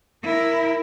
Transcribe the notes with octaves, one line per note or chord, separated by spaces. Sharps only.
E4 A#4